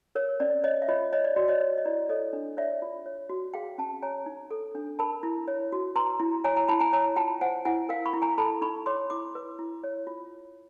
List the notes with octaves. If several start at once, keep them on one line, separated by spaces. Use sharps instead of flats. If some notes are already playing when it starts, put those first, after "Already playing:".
A#4 C#5
C#4 D5
C#5 D#5
E5
F4 C#5 D#5
C#5 D#5
D5
F#4 D5
C#5 D#5
C#5
D#5
E4 D5
A4 C#5 D#5
D4
C#5 D5 E5
F4
C#5
F#4
G#4 F5 G5
C#4 G5 A5
C#5 G#5 A#5
D#4
A4
D4
A#4 A5 B5
E4
C#5
F#4
B4 A#5 C6
E4
C#5 G#5 A#5
G#5 A#5
E4 A5 B5
G#5 A#5
C#5 G#5 A#5
F4 G5 A5
C5 F#5 G#5
E4 F#5 G#5
A#4 F5 G5
B5 C#6
E4
G#5 A#5
A4 A5 B5
D#4 B5 C#6
C#5 C6 D6
E4 C6 D6
B4
E4
C#5
F4